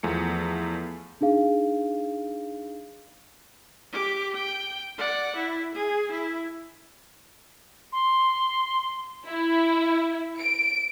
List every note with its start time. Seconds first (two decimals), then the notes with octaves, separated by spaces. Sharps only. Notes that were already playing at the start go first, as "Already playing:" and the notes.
0.03 E2 F3 A3 C#7
1.21 D4 D#4 G#4 F5
3.92 G4 D6
4.34 G5
4.97 D5 F#5
5.35 E4
5.74 G#4
6.11 E4
7.92 C6
9.27 E4
10.39 D7